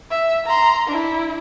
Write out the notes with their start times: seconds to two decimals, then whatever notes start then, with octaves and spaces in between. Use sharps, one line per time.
0.11 E5
0.47 A#5 C6
0.88 D4 E4